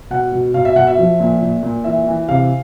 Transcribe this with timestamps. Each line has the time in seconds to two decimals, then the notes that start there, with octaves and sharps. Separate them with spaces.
0.10 B2 F#5
0.32 B2
0.54 B2 F5
0.65 E5
0.76 B2 F#5
0.87 E5
0.97 F3
1.20 A#2
1.42 A#2
1.63 A#2
1.84 E3 E5
2.07 E3
2.28 C3 F5